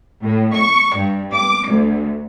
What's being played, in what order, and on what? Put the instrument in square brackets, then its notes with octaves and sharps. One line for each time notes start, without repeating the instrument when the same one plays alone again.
[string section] A2
C#6
G2
D6
D2